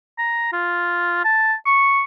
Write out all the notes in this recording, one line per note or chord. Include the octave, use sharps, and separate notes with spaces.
A#5
F4
A5
C#6